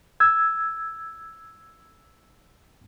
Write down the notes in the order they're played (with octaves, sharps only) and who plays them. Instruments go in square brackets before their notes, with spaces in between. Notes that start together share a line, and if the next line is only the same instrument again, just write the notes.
[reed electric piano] E6 G#6